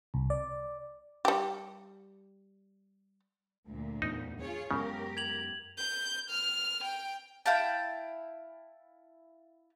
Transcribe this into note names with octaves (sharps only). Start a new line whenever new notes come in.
C2
D5
G3 G4
D2 A#2
E2 A2 B3 D#4
F4 G#4 C#5
F#2 C#3 G#3 B3 G4 A#4
G#6 F7 F#7
G6
F6
G5
E4 F5 G5 A5